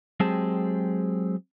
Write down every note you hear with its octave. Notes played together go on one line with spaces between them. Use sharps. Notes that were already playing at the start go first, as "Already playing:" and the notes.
F#3 G#3 C4 G4 G#4 A5